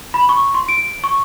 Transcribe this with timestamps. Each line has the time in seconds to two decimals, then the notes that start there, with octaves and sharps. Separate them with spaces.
0.14 B5
0.29 C#6
0.54 C6
0.69 D7
1.04 C#6